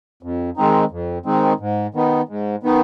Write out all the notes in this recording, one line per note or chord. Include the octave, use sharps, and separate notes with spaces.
F2
D#3 G#3 C4 D#4
F2
D#3 G#3 C4 D#4
G#2
D#3 B3 D#4
G#2
D#3 B3 D#4